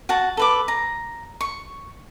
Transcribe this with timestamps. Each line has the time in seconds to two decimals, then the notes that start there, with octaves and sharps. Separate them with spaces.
0.09 F#4 F#5 A5
0.37 A4 B4 D6
0.68 A#5
1.41 C#6